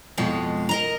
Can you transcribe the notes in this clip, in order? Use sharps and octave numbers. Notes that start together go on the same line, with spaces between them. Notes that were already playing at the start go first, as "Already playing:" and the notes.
F2 B2 F3 G#3
A#4 D#5 A#5